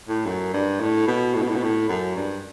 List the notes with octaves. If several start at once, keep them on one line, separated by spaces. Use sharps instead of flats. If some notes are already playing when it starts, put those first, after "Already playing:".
A2
F#2
G2
A2
B2
A2
B2
A2
B2
A2
F#2
G2